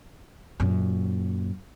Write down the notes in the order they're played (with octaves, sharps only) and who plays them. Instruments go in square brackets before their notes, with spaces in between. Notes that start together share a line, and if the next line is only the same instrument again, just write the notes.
[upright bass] F#2 A#2